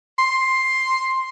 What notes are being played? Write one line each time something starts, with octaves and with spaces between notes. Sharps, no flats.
C6